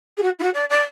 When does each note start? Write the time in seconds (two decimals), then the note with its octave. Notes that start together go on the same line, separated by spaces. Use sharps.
0.17 G#4
0.22 F#4
0.39 E4
0.43 F#4
0.54 D5
0.70 D5